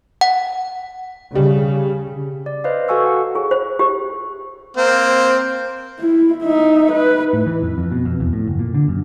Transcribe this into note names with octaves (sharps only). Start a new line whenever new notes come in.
F#5
C#3 G3
D5
B4 C5 D#5 F5
F#4 A4 F5 G#5 C#6 E6
F#5
G#4
C5
G4
A#3 C4
E4
D#4 E5
B4
A2
E3
F2
F2
B2
F2
E2
A2
F#1
A#2
D3
F#2